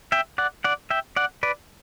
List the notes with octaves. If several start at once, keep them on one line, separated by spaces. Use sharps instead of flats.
E5 G5
D5 F#5
D5 F#5
E5 G5
D5 F#5
B4 D5